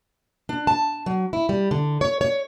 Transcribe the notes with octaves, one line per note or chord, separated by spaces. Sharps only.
D4
A5
F#3
E4
G3
D3
C#5
C#5